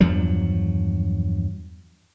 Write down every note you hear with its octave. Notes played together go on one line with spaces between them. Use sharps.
E2 G2 F3 F#3